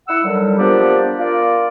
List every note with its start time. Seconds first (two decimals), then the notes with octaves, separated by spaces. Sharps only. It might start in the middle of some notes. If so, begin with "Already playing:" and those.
0.08 E4 F#5 E6
0.23 D3 D#3 F#3 G3
0.58 F3 A#3 B3 D4 G4 D5
1.18 F4 A#4 D5